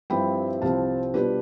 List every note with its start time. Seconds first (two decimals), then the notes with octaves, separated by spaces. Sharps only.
0.10 G2 F3 C4 E4 G5 B5
0.62 C2 C3 F3 C4 F5 A5
1.14 B2 G3 D4 F4 G4 B4